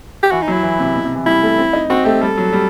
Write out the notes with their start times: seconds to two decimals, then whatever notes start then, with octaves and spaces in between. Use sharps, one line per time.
0.23 G4
0.31 E3 F#4
0.42 D#4
0.47 F#3
0.52 E4
0.63 E3
0.79 C3
0.95 B2
1.05 C3
1.15 E3
1.26 G3 E4
1.42 A3
1.58 C4
1.73 D#4
1.90 C4 F#4
2.05 A3 G4
2.21 G3 A4
2.37 F#3
2.53 G3